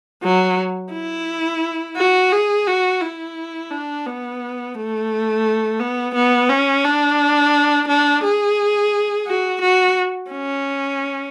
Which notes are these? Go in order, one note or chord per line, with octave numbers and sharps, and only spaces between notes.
F#3
E4
F#4
G#4
F#4
E4
D4
B3
A3
B3
B3
C#4
D4
D4
G#4
F#4
F#4
C#4